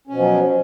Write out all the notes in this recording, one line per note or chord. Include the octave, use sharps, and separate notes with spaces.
B2 F3 F#3 C#4